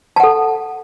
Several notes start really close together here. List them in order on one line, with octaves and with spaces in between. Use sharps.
A5 F#5 A4